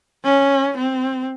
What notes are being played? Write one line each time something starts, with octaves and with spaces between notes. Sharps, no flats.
C#4
C4